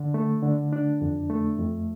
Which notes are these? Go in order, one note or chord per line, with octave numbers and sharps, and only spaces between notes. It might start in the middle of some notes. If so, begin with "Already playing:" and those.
Already playing: D3
A3
D3
D4
F2
A3
F2